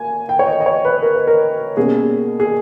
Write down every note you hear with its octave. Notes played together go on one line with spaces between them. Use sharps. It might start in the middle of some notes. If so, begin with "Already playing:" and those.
Already playing: A#3 G#5
G5
C#5
D#5
D#5
C#5
B4
A#4
B4
A#4
B2 G3 A#3 C#4 G#4
G#4